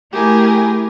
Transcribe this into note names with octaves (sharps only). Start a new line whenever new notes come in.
A3 E4 G4 G#4 A#4